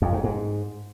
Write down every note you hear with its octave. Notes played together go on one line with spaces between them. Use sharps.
F2
G#2
G#2